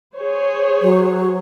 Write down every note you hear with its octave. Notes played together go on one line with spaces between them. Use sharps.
G#4 C5 C#5
F#3